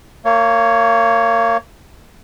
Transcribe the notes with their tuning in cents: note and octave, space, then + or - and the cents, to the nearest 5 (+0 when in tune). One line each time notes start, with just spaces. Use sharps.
A#3 -25 C#5 +0